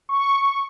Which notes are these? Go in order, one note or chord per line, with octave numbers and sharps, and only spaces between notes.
C#6